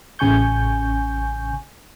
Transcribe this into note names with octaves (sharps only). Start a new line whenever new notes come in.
A1 C#3 G#5 C#6 G6